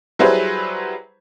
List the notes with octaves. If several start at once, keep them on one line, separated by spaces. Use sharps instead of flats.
F#3 G3 E4 G#4 B4 C5